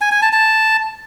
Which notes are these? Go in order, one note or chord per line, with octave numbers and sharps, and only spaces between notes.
G#5
G#5
A5
A5